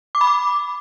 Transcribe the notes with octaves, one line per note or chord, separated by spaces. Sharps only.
D6
B5
D6